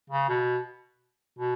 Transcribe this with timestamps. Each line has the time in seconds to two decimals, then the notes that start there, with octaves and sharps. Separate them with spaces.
0.10 C#3
0.29 B2
1.39 B2